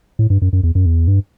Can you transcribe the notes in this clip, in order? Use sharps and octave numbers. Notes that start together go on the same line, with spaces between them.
A2
G2
F#2
F#2
E2
F#2
E2
G2